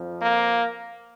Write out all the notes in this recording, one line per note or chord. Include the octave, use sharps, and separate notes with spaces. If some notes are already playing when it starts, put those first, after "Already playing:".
Already playing: F2 F3
A#3